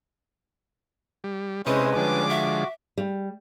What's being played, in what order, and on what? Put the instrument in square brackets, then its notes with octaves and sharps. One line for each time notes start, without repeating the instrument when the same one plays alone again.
[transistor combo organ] G3
[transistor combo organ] C3 [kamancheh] G#3 C#4 [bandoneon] E4 C5 D#6 [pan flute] B4
[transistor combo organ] D3 F3 G#3 [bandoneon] G3 C#4 D4 [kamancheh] D6
[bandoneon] F#4 [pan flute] E5
[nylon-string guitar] G3